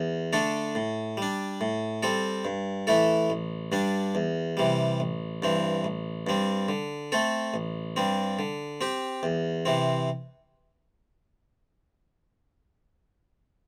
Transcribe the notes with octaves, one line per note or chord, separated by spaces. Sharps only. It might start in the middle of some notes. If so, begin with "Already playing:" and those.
Already playing: E2
D3 A3 D4 A4
A2
G3 D4
A2
G3 C4 A4
G2
E3 A3 E4 A4
A1
G2 G3 D4
E2
C3 E3 G3
A1
G2 E3 C4
A1
G2 G3 C4
D3
A3 C4 A4
A1
G2 G3 C4
D3
C4 G4
E2
C3 E3 C4